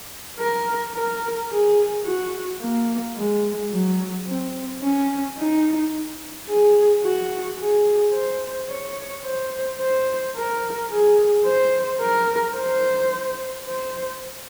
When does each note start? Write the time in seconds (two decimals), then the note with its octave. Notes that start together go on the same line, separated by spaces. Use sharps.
0.39 A#4
0.94 A#4
1.50 G#4
2.05 F#4
2.60 A#3
3.16 G#3
3.71 F#3
4.27 C4
4.82 C#4
5.38 D#4
6.48 G#4
7.03 F#4
7.59 G#4
8.14 C5
8.69 C#5
9.24 C5
9.80 C5
10.36 A#4
10.90 G#4
11.45 C5
12.01 A#4
12.57 C5
13.68 C5